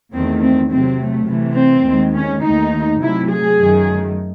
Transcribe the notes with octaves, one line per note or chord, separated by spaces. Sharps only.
E2 D#3 A3 C4
C4
C3 F#3 A3 C4
A3
C3 E3 A3
C4
D#2 D#3 G#3
C#4
D#2 D#3 A3 D#4
C3 F#3 A3 E4
G#4
F#2 D#3 A3